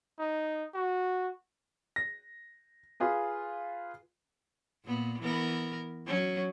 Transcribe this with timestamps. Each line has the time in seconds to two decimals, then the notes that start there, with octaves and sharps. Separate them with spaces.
0.19 D#4
0.74 F#4
1.96 A#6
3.00 F4 G#4 B4
4.85 A#2 B3
5.21 E3 B3 A#4
6.07 F#3 C#4